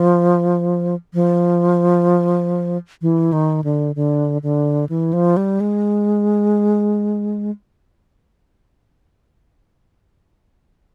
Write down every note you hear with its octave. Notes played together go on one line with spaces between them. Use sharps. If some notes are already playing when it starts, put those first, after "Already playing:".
Already playing: F3
F3
E3
D#3
D3
D3
D3
E3
F3
G3
G#3